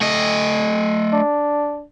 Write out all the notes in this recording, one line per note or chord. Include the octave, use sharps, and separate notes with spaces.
A3 D#5
D4